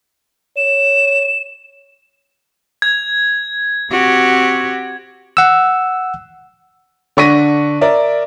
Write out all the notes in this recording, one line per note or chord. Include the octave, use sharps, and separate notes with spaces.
C#5 E7
G#6
C4 F#4 G4
F#5 E6
D3 D4 C#6 A#6 B6 D#7
A#4 D5 E5